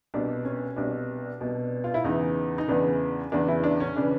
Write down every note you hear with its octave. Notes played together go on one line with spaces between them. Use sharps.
C2 B2 D4
C#4
C2 B2 D4
C2 B2
F4
E4
E2 C#3 E3 D#4
D#4
E2 C#3 E3 D4
E2 C#3 E3 D4
E4
D4
C#4
C#3 E3 D4